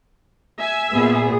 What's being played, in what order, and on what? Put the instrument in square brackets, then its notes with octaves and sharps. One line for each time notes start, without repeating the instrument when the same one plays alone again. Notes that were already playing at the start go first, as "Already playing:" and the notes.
[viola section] E5 G#5
[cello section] A#2 B3 G#4